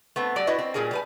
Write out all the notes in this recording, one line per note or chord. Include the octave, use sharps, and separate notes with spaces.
A3 B3 C4
F#3 G3 D5
E4 F#4 B4 D#5
C4
A#2 G3 G#4 A#4 G#5
G3 B4 G#5